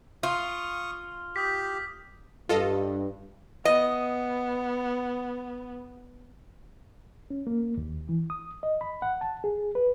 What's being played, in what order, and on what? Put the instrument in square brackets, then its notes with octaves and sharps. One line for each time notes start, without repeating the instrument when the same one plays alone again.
[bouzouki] F4 [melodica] C#6 D#6 [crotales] F6
[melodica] G4 [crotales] D#6 G6 B6
[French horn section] G2 [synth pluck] F4 A4 D#5
[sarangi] B3 [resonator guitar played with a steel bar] D#5
[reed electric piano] C#4
A#3
D#2
E3
D#6
D#5
B5
F#5
A5
G#4
B4